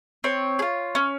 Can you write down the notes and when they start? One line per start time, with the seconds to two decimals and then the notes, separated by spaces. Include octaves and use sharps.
0.24 C4 C#5
0.59 G#4
0.62 F4
0.95 C#4